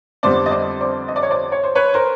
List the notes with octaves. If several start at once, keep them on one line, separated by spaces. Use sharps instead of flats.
F2 D3 G3 B3 C5 D5
D#5
C5 D5
C5 D5
D#5
D5
C#5
C5 D5
C#5
C5
B4 C#5
A#4 C5